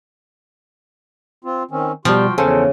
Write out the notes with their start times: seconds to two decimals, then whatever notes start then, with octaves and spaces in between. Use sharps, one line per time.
1.44 C4 F4
1.71 D#3 C4 C#4
2.05 B2 F3 G3 F4 F#4 G5
2.38 E2 C#3 C#4 A4 C5